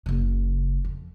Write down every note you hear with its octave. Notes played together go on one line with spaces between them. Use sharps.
F#1 C#3
F2